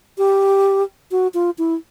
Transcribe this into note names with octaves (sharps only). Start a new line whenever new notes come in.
G4
F#4
F4
E4